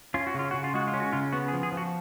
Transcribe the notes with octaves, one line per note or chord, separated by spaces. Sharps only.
C#4 F4
F#4
C#3 F4
C#3 F#4
F4
G#3 F#4
F4
C#4
F#4
C#3 F4
B3 F#4
G#4
F3
G#4
F3
F#4